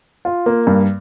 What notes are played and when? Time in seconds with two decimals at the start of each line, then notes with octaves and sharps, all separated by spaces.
0.25 F4
0.46 A#3
0.67 G2